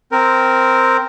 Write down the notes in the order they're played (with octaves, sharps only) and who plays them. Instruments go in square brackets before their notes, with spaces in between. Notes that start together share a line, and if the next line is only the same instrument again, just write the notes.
[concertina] C4 A#4